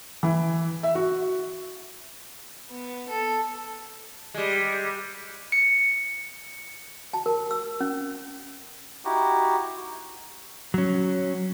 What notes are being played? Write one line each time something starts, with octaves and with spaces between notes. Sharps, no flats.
E3
E5
F#4
B3
A4
G3 G#3
C#7
A5
A#4
E6
C#4
D#4 E4 F#4 G4
F#3 C#4